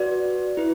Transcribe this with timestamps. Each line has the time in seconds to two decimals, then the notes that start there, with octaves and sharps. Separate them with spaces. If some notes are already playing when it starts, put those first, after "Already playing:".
Already playing: F#4 B4 D5
0.57 E4 B4